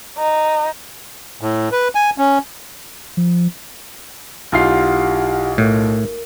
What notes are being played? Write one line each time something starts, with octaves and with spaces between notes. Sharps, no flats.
D#4
A2
B4
G#5
C#4
F3
B1 E4 F4 G4 F#5 C7
A2 A#4